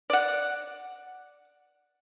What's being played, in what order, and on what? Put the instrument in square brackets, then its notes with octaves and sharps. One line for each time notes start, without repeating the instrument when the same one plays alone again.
[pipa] D5 F#5